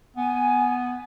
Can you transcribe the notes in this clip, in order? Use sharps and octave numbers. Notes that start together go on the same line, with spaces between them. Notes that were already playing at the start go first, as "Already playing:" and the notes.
B3 G#5